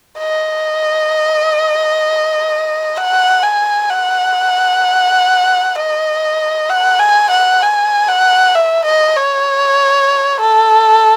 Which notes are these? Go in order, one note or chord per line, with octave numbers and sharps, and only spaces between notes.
D#5
F#5
G#5
F#5
D#5
F#5
G#5
F#5
G#5
F#5
E5
D#5
C#5
A4